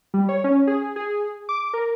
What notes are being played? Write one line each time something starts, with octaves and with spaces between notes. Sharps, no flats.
G3
C#5
C#4
G#4
G#4
D6
A#4